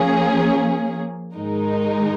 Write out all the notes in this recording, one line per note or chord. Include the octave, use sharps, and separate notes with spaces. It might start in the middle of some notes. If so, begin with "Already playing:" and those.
Already playing: F3 A#3 C#4 G#4
G#2 D#3 G#3 D#4 A#4